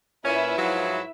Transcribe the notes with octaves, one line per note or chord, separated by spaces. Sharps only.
A#2 C#4 E4 B4 E5
G#2 F3 F#3